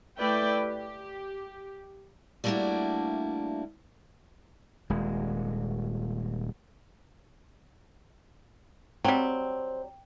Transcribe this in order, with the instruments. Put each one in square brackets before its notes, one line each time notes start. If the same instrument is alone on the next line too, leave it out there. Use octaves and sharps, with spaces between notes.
[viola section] A3 E4 B4 D5 G5
G4
[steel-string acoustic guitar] G3 A3 A#3 D4 E4 F#4
[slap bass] D#1 G#3
[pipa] F#3 G3 [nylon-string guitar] C4